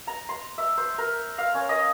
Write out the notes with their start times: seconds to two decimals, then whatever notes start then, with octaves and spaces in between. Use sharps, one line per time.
0.07 A#5
0.29 C6
0.58 E5
0.78 C5
0.98 A#4
1.38 F5
1.54 C#4
1.69 D#5